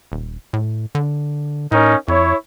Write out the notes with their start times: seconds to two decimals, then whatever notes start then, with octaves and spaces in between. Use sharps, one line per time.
0.12 D#1
0.53 A2
0.95 D3
1.72 A2 C#4 D#4 A#4
2.08 F2 E4 C#5